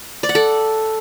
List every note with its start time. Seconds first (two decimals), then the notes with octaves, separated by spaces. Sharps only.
0.23 D5
0.29 F#5
0.35 A4